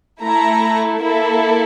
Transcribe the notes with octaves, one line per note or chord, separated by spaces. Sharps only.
A3 E4 A4 A#5
A#3 E4 A4